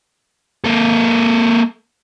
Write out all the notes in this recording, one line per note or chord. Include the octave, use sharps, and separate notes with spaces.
A#3 A4